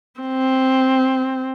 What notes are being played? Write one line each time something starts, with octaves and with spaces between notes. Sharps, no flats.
C4